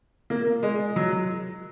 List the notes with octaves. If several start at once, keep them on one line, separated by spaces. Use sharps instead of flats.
A#3
G#3
F#3